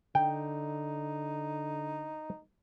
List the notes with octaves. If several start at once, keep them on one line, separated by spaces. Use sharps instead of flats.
D3 D#4 G5